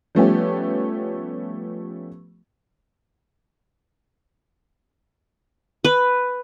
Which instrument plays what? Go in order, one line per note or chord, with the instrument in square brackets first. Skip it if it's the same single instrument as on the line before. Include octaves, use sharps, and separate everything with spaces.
[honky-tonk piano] F3 G3 A3 B3 C#4 G4
[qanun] B4